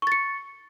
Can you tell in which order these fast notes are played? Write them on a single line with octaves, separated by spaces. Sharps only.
C#6 A6 C#7